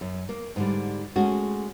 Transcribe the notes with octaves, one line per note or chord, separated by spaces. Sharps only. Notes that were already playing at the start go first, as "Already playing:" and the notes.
F#2
A#3
G#2 D3 G3
G#3 A3 C#4 F#4